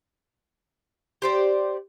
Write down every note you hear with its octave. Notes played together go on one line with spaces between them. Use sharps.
G4 C5 D5